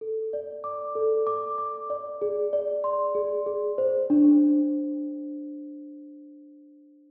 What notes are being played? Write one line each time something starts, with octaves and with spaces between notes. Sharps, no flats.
A4
D5
D6
A4
D6
D6
D5
G#4
D5
C6
G#4
G#4
C5
D4